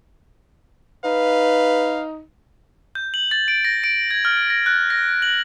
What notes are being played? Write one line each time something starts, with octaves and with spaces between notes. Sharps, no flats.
D#4 B4 F5
G6
F#7
A6
D7
A#6
D7
G#6
F6
A#6
F#6
A#6
F#7